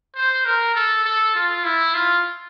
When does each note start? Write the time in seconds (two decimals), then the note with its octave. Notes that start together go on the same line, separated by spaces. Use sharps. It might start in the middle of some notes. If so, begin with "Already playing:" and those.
0.15 C5
0.45 A#4
0.75 A4
1.04 A4
1.35 F4
1.65 E4
1.95 F4